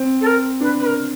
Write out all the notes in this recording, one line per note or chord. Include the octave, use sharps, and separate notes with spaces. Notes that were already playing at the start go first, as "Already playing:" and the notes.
Already playing: C4
A4
A#4
D4 B4
B4
A#4